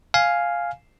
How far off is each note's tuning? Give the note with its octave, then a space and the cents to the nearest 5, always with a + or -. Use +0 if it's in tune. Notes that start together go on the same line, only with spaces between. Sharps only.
F5 +0 G#5 +0